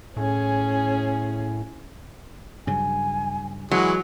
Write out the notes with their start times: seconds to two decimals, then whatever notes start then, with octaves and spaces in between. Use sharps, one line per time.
0.17 A2 C#4 G#4
2.67 G2 C#3 F#3 G#5
3.71 E3 F#3 G#3 C#6